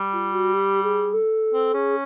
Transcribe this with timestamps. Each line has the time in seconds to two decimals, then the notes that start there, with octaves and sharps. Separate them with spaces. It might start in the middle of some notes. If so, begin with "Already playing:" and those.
Already playing: G3
0.13 F4
0.33 F#4
0.53 G4
0.83 G#4
1.13 A4
1.54 C4
1.74 C#4 G#4